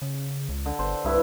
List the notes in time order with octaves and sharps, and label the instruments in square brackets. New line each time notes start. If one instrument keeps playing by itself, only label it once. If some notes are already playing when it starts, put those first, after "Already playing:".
[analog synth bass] C#3
C#2
[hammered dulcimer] D3
[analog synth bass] G1 [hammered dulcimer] C5
[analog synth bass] C2 [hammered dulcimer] G2 E4 B4